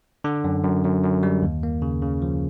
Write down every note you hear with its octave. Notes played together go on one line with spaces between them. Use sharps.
D3
F#2
F#2
F#2
F#2
G3
D#2
A#3
C#3
C#3
F3